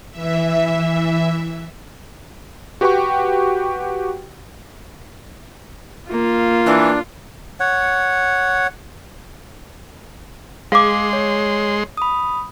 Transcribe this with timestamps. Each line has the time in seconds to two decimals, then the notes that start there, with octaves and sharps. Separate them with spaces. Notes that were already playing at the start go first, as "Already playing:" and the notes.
0.10 E3 E5
2.81 F#4 G4 B4 F#5 G5 C#6
6.11 A#3 F4
6.66 E3 D4
7.60 C#5 F#5
10.72 G#3 G#4 F5 C6 D6
11.13 C#5
11.97 B5 D#6